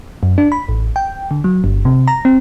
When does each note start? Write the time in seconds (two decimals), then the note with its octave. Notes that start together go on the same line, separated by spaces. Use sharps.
0.23 F#2
0.38 D4
0.52 B5
0.69 A1
0.96 G5
1.31 D3
1.44 F#3
1.64 G1
1.85 C3
2.08 A#5
2.25 C4